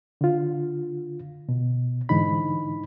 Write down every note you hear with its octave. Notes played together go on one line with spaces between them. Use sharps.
D3 F4
B2
G#2 D3 E3 D#4 B5